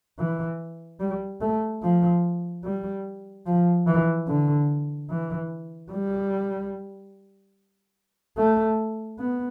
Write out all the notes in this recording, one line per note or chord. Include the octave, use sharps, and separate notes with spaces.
E3
G3
A3
F3
G3
F3
E3
D3
E3
G3
A3
B3